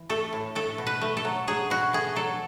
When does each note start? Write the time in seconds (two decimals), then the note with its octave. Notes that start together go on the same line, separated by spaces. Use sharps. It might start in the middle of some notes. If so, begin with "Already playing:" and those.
Already playing: E3
0.09 A3 A4
0.33 A2
0.55 A3 A4
0.78 B2
0.87 B4
1.01 A3
1.17 A4
1.25 F#3
1.47 F#3 G#4
1.70 B2 F#4
1.93 A3 G#4
2.16 F#3 A4